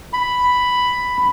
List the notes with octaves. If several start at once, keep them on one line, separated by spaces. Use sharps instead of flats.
B5